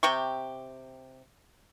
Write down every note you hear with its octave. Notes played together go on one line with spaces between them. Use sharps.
C3 G4 C#6